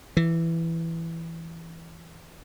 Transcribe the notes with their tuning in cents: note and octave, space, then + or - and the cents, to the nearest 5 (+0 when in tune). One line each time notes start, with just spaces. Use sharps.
E3 +5